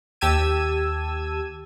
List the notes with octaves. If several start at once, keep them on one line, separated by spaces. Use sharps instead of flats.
D#2 G4 A5 E6 G#6 D#7